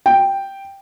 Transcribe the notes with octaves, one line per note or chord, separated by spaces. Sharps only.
G5